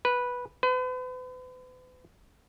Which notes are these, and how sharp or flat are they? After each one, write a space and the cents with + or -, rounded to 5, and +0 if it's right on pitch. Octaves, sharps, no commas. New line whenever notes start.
B4 -10
B4 +40